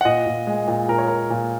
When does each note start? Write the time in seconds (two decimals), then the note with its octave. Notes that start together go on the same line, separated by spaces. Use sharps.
0.01 F#5
0.05 A#2 D#5
0.26 A#2
0.47 G#3
0.67 A#2
0.88 A#2 A#4
0.98 C#5
1.08 A#2 A#4
1.30 A#2